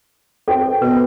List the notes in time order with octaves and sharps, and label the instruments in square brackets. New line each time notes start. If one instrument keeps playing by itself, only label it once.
[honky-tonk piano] C4 G5 [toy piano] A4
[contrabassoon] B2 [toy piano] B4